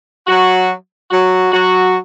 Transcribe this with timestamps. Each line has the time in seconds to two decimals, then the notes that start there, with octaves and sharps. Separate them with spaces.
0.27 F#3 F#4
1.11 F#3 F#4
1.52 F#3 F#4